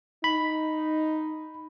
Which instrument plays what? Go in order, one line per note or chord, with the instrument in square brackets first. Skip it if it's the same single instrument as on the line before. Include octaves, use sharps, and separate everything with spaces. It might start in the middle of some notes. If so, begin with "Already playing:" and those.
[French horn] D#4 [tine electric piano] B5